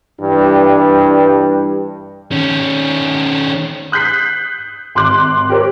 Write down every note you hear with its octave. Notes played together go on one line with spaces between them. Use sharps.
G2 E3 G3
D#3 C#4
D#6 F#6 G6 B6 C7
G#1 C6 D6 F#6
G4 A#4 C5 C#5